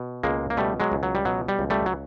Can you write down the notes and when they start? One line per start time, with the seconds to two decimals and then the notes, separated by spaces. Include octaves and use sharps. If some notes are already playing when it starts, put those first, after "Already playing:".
Already playing: B2
0.23 C#2 G#3 A#3
0.50 A#3
0.57 B2 G3 A3
0.80 F#3 G#3
0.92 C#2
1.03 F#3
1.15 G3
1.25 B2 F#3
1.48 G3
1.59 C#2
1.70 G3 A3
1.86 F#3